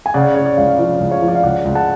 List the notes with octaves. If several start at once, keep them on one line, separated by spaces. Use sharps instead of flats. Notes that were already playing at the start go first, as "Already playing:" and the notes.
G#5
C#3 D5 F#5
C#3 C#5
D5
C#2 C#5 F5
F3 C#5 F5
C#2
C#5 F5
F3
D5
F5
C#2 D5 F#5
C#2
F#5 A5